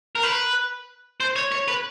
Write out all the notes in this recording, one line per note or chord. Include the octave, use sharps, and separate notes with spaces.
A#4
B4
C5
C#5
C#5
B4